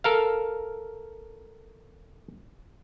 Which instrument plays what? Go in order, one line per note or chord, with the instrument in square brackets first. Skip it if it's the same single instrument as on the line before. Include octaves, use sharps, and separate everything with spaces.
[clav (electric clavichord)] A4 A#4 F5